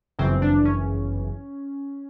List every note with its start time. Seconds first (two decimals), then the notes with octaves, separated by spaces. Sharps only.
0.19 G1 F#2 C#3 E3 C4
0.42 D4
0.65 C#4